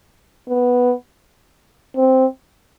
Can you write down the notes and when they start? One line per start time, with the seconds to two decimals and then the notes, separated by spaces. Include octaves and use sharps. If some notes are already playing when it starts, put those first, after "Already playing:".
0.49 B3
1.96 C4